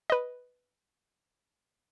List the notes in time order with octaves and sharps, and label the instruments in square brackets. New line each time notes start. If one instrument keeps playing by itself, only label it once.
[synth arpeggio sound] B4 D#5